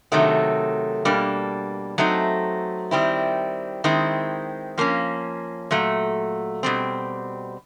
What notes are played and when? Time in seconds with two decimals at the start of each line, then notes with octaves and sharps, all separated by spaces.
0.12 C3 D#3 F#3 A3
1.05 B2 G3 A#3 D4
1.98 F#3 A3 C4 D#4
2.91 D#3 G3 C4 E4
3.84 D#3 G#3 C4 E4
4.78 F3 A#3 C#4
5.71 A#2 F#3 A3
6.63 B2 G3 C4